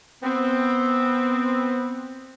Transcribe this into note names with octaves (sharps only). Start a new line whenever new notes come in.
B3 C4